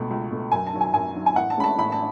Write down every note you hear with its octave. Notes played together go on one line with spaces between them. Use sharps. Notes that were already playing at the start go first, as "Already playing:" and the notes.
Already playing: C#2 B2 A3
C#2
B2 A3
F#2 G#5
A5
D#3 F#3
G#5
F#2 G#5
D#3 F#3
G#5
A1 F#5
A5
A2 G#3 C#4 B5
A5
A1 B5
A5